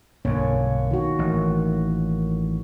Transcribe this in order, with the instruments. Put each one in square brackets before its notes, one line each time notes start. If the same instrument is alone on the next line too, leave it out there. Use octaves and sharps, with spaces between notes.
[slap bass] B1 G2 D3 [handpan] A#3 C#4 C#5
[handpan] D#3 F#4
[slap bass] A1